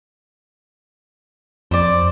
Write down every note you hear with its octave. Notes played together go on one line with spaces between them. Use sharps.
F2 C5 D5